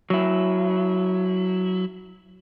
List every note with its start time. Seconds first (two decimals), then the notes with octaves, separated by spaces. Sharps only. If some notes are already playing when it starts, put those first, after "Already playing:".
0.10 F#3 E4